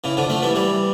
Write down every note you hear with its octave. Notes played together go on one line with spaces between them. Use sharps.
C#3 E3
D3 F3
F3 A3
E3 G3
E3 G3